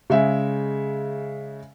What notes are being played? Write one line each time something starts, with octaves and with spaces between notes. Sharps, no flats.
C#3 G#3 E5